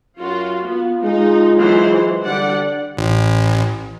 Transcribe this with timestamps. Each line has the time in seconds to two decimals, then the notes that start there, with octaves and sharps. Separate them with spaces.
0.19 F#2 F4 F#4
0.66 B3 F4
1.03 G#3 D#4
1.58 E3 F#3 C5
2.24 D3 G3 D5 F#5
2.97 A1